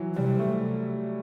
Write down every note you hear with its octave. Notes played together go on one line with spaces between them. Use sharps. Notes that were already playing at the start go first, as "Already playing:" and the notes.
Already playing: E3 F#3
C3 G3
A3